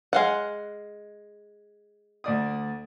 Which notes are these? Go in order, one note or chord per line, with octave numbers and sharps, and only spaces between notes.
G#3 F5 F#5
D2 D5 D#6